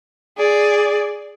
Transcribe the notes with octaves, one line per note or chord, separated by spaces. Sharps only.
G#4 D5